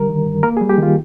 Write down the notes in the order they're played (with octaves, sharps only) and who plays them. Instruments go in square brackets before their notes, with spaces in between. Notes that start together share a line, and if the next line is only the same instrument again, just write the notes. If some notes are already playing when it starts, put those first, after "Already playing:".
Already playing: [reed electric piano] D3 G3 A#4
D#3
G2
A#3 A#4
G#4
G3
G4
D#3
F4